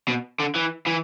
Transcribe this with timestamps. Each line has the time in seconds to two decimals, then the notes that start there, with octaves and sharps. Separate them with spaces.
0.08 B2
0.40 D3
0.55 E3
0.87 E3